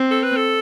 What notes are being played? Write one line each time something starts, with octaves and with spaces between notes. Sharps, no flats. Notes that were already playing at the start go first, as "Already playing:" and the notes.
Already playing: C4
A4
B4
A4